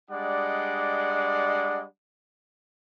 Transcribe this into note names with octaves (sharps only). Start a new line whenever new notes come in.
G3 G#3 D4 D5 D#5 F#5